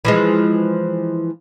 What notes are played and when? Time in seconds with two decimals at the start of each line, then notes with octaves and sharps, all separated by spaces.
0.05 E3 F3 G#3